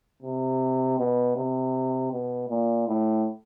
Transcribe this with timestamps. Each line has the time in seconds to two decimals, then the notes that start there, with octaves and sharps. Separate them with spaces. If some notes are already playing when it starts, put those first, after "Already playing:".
0.22 C3
0.99 B2
1.36 C3
2.12 B2
2.49 A#2
2.88 A2